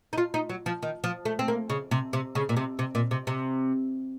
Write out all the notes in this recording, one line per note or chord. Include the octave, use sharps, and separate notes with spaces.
D#4
F4
D#4
F#3
F3
D#3
F3
A3
C4
A#3
C#3
C3
C3
C#3
A#2
C3
C3
A#2
C3
C3